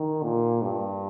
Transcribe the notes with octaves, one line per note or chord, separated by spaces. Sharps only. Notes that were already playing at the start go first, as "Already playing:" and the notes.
Already playing: D#3
A#2
G2